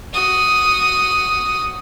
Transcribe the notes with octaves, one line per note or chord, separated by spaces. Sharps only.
F#4 D#6